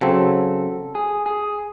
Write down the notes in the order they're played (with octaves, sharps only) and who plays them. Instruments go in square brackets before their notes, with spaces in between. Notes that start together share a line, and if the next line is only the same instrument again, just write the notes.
[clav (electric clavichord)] C#3 F#3 C4 [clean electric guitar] A4
[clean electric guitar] G#4
G#4